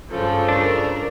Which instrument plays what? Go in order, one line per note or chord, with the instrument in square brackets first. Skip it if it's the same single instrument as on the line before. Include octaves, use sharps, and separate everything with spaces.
[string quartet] G2 C#3 F3 [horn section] A4
[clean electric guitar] D4 [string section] A#4 D5